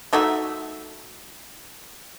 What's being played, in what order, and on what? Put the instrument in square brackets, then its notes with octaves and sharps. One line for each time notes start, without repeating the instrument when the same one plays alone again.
[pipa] A3 D#4 F#4 E5